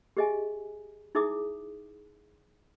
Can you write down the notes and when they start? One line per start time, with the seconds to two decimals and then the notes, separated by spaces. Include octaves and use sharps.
0.17 G4 G#4 D#5 E5 G#5
1.15 D#4 E4 G#4 E5 D6 D#6